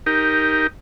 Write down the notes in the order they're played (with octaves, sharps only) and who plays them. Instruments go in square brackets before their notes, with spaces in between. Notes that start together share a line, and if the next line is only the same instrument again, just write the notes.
[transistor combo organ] D#4 G4 A#4